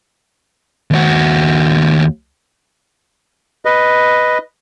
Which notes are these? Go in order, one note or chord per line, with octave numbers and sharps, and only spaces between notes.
D#2 F#4
B4 D#5